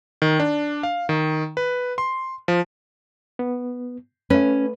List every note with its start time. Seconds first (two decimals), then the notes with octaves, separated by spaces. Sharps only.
0.22 D#3
0.40 D4
0.83 F5
1.09 D#3
1.57 B4
1.98 C6
2.48 F3
3.39 B3
4.30 A3 C#4 B4